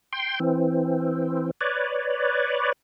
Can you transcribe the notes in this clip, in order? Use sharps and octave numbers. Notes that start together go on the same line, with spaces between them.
G5 C6
E3 C4
B4 C#5 D5